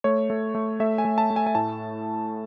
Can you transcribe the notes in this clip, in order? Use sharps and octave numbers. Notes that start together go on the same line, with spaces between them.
A3 C#5
A3
A3
A3 E5
G#5
A3
A5
A3
G#5
G#5
A2 A5